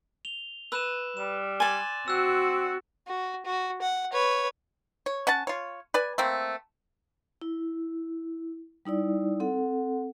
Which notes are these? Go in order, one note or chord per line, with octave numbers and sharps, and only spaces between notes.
F7 G7
B4 E6 F#6 E7
G3 E7
D5 G#5 C6 A6 E7
C4 F#4 E6 F#6
F#4
F#4
F#5
B4 C#5
C#5
C#4 F#5 A5
F4 C#5
B4 D5 G#5
A3 A#3 C4
E4
G3 D#4 E4 D5
C4 A4 F#5